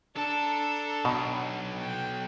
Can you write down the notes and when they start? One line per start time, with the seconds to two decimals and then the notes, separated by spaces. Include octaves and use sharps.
0.16 D4 A4 A5 A#5
1.05 B1 B2
1.77 G5